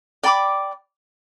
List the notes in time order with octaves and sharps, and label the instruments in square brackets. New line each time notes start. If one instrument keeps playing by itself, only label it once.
[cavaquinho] D5 G5 B5 D6